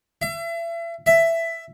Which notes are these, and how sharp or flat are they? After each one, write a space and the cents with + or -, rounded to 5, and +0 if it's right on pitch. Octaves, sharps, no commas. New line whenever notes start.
E5 +35
E5 +10